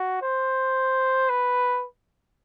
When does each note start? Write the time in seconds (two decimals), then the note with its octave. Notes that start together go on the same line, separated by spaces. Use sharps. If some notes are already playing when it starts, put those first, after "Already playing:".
Already playing: F#4
0.22 C5
1.29 B4